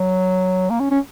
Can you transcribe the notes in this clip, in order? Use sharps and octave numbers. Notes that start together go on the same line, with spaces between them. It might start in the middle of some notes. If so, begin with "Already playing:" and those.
Already playing: F#3
A#3
C#4
C#4